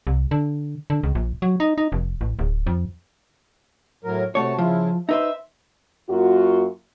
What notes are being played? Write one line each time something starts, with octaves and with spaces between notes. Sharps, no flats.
C2
D3
D3
C#2
A#1
F#3
D#4
D#4
F1
A1
D1
F2
A2 F#3 A#4
C3 A3 F#4 C#5 A5
C#3 F3 E4 F4
D#4 B4 C5 E5
F#2 A#3 F4 F#4